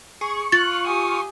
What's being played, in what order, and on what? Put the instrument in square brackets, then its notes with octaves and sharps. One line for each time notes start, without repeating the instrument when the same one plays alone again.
[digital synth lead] G#4 [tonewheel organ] C#6
[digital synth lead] F4 [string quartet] F#6 [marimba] A6
[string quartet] G4 G#5 D#6